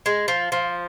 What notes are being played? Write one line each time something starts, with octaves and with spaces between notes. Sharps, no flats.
G#3
F3
F3